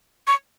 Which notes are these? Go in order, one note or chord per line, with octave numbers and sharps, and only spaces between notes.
C#6